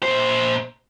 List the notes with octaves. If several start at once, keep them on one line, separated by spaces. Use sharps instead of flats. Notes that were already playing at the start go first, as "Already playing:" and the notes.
A#2 C5